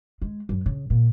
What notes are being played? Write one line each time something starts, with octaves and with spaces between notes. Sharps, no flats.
G#3
F#2
C#3
A#2